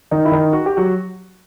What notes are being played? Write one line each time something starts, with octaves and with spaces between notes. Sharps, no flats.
D#3 D#4
E4
D#3 D#4
F#4
G4
F#3 F#4